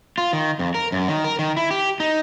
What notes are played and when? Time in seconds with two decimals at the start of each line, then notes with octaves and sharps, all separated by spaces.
0.18 F4
0.33 D#3
0.59 F2
0.74 A#4
0.92 F#2
1.08 D#3
1.24 A#4
1.39 D#3
1.57 E4
1.71 G4
2.00 D#4